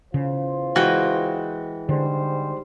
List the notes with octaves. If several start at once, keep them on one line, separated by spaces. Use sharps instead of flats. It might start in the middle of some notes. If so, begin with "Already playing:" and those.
E2 C#3 F4 C5
E3 G#3 F#4 G5
G#2 D3 G3 C5